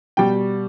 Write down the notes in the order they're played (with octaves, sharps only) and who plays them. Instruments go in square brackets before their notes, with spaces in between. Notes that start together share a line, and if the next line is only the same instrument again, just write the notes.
[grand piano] B2 G3 G5